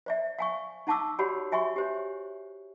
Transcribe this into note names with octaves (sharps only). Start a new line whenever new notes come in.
C5 D5 E5
F5 G#5 C#6
D#4 F#5 A5 C#6 D6 E6
F#4 G4 C#5 D5 F#5 B5
F#4 E5 G#5 C6 C#6
G4 C5 C#5